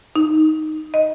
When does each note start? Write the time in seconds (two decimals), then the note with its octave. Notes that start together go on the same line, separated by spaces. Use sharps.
0.16 D#4
0.94 D#5